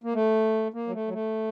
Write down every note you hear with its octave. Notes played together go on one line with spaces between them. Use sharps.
A#3
A3
A#3
F#3
A3
F#3
A3